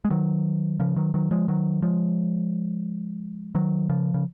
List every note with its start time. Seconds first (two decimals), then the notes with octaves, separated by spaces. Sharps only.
0.05 G#3
0.10 D#3 F#3
0.79 C#3 F3
0.96 D#3 F#3
1.14 D#3 F#3
1.31 F3 G#3
1.48 D#3 F#3
1.82 F3 G#3
3.55 D#3 F#3
3.89 C#3 F3
4.14 C#3